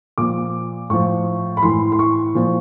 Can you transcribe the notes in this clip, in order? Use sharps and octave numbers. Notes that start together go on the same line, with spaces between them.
A#2 F3 D6
A2 F3 C#6
B5
A2 E3 C6
C6
C#6
A#2 F3